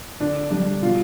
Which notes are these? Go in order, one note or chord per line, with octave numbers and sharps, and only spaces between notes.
D3 D4
G3 D4
B2 F4